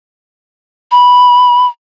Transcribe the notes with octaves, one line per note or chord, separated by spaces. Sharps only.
B5